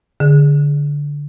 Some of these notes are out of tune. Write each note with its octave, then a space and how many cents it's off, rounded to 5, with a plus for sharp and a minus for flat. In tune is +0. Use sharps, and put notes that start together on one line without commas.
D3 -10 G#4 +0